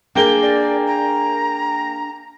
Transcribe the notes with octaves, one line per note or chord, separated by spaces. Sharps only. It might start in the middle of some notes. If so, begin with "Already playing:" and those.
A#3 D4 G#4 A#4 G5 G7
D5
A#5